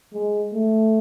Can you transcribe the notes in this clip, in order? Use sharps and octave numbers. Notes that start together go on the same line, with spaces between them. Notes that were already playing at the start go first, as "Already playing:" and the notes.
G#3
A3